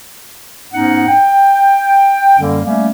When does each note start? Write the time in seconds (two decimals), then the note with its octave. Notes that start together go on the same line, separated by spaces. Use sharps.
0.73 G#2 B3 C#4 D#4 F#5
1.08 G5
2.40 F#2 D3 G3 A#3 C#4
2.65 G3 A3 A#3 C#4